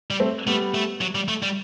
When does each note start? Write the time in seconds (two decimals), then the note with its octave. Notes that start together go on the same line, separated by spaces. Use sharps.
0.11 G3
0.20 A3 C4
0.47 G3 A3 B3
0.74 A3
1.01 F#3
1.15 G3
1.28 A3
1.43 G3